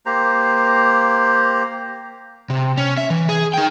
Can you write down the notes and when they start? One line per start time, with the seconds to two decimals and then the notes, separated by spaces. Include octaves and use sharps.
0.06 A#3 G4 C5 A#5
2.50 C3
2.77 C#4
2.97 E5
3.10 E3
3.29 G#4
3.54 D#4 G5